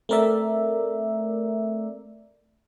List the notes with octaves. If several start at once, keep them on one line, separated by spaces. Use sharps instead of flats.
A3 C4 A#4 D5 E5